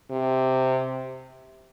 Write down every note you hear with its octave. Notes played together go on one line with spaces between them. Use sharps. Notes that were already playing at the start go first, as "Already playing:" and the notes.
C3